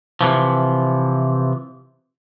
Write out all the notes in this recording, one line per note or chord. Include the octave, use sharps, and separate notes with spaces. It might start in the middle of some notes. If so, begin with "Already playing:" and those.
C3 E3 F3